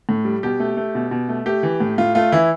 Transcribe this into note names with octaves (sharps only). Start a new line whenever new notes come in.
A2
G3
B2 G4
A3
A3
B2
B2
A3
A3 G4
E3
A2
A2 F4
A3 F4
E3 E4